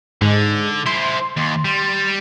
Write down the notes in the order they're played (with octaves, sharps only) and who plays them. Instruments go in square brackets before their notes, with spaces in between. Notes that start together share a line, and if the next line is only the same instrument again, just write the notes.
[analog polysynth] G#2 [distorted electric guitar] D3
[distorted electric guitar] E4 C5 [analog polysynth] C6
[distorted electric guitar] D#2
G3